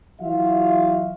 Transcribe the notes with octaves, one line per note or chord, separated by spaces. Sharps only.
E3 F#3 F4 F#4 E5 F5